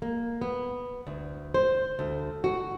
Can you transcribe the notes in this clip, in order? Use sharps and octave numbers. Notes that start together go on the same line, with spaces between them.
A#3
B3
D2
C5
D2
F#4